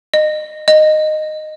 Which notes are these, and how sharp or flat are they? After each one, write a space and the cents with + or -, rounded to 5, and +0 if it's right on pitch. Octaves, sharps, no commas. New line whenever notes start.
D#5 -25
D#5 -10